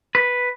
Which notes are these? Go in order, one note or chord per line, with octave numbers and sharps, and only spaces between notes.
B4